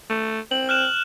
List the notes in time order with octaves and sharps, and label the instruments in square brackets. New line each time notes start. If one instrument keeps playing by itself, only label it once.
[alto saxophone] A3
[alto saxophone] C4 [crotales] F#7
[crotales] F6 F#6 E7